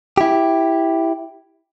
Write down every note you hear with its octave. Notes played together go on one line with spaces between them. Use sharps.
E4 G4